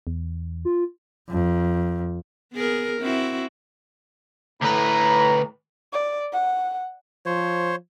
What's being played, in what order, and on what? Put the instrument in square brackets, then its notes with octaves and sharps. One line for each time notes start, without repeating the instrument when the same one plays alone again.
[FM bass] E2
[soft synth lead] F4
[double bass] F2
[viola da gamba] B3 G#4 A#4
C4 E4 F#4
[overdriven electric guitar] D2 B4 [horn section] A2 A#5
[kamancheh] D5
F#5
[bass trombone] F3 [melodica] C5 C#5